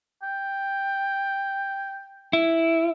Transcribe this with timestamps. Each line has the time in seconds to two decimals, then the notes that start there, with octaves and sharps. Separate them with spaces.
0.23 G5
2.33 E4